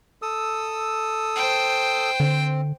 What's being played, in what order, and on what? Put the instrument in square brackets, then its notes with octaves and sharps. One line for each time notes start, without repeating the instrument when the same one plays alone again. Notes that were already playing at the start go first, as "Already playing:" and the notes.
[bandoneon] A4 D#6 E6
[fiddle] C5 G5
[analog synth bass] D3 [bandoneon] C4